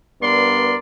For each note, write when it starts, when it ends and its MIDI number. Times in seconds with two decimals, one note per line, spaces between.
0.21 0.75 43
0.21 0.75 59
0.21 0.75 70
0.21 0.75 74
0.21 0.75 84